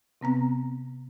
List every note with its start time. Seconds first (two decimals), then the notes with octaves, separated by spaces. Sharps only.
0.21 C3 B3 C4 A#5